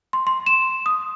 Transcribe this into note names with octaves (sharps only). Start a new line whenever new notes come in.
C6
C6
E7
D#6